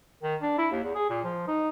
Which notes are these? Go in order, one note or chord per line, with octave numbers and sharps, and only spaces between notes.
D#3
D4
E4
D#2
E2
G#4
A#2
F3
D#4